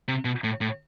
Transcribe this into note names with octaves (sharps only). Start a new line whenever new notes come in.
C3
B2
A2
A2